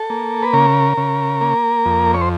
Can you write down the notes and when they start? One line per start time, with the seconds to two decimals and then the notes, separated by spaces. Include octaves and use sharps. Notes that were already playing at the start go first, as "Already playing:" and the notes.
Already playing: A4
0.10 A#3
0.43 B4
0.53 C#3 A#4
0.97 C#3
1.41 A#3
1.86 F2
2.14 C#5
2.21 C5